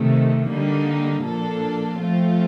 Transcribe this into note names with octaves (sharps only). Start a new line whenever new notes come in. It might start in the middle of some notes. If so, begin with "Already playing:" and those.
Already playing: C3 D#3 A3
D3 G3 A#3 D#4
A#2 F3 A#3 D4 A4
F3 A3 C4 F4